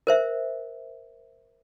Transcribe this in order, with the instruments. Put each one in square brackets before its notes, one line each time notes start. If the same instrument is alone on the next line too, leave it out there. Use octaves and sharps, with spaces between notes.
[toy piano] A#4 C5 E5